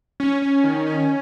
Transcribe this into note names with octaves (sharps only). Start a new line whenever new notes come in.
C#4
C#4
D#3
C#4